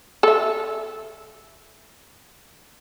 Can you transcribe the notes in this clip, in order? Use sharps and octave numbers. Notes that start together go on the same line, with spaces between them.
A4 E5